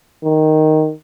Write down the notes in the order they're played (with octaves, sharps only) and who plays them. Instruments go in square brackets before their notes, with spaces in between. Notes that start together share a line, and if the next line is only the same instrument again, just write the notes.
[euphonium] D#3